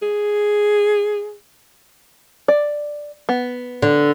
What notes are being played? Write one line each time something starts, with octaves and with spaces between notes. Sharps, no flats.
G#4
D5
B3
D3